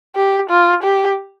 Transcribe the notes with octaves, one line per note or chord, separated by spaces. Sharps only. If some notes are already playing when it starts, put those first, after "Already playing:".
G4
F4
G4